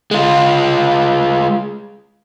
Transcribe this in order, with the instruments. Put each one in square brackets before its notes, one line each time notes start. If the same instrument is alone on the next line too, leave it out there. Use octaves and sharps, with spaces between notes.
[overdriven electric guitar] G#3 F4